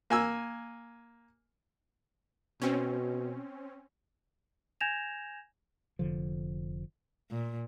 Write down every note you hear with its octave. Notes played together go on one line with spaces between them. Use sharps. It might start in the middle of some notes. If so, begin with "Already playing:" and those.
A#3 G#5 E6
B2 C4 C#4
G#5 G6 G#6 A#6 E7 F7
F1 D3 F3
A#2